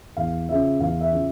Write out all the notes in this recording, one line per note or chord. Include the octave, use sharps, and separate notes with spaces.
E2 F5
C#3 F3 E5
E2 F5
E5
C#3 F3